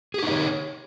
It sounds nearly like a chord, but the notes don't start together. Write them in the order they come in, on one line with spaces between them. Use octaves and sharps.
G#4 G4 D#4 D#5 C#5